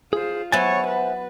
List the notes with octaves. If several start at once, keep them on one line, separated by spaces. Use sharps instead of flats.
F4 G#4 C5
F#3 B3 C5 C#5 E5 G#5 A6
B4